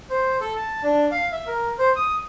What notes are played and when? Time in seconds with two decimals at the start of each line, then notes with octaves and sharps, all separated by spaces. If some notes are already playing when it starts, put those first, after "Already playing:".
0.10 C5
0.41 A4
0.56 A5
0.83 D4
1.11 F5
1.32 E5
1.47 A#4
1.78 C5
1.96 D#6